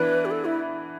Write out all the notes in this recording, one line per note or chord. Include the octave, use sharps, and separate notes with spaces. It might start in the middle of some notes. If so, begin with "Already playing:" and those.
Already playing: E3 B3 D4 B4
G4
A4
E4